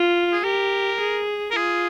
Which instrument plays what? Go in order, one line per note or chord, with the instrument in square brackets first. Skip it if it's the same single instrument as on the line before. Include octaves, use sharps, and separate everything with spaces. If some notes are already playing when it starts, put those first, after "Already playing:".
Already playing: [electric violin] F4
[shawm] G#4
[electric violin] G4 [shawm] A#4
[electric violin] G#4
[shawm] A#4
[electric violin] F4 [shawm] G#4